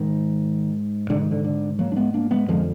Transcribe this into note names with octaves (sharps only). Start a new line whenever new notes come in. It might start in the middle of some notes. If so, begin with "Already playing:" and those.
Already playing: G#2 D#3
G#2 D3
D#3
D3
D3
F#3 A#3
D4
G#3 B3
A#3 D4
G#3 B3
F2 D3 F3 G#3